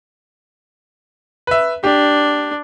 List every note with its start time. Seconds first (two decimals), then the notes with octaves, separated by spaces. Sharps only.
1.47 B4 E5
1.84 D4 G4